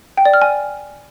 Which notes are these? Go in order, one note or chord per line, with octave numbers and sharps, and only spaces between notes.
G5
D5
F6
G#5